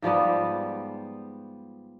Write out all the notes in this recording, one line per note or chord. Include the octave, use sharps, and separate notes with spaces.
G#2 F3 G3 B3